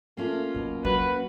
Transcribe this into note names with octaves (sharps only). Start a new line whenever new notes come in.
A3 A#3 C#4 F4
B2 F#3
F#3 F#4 B4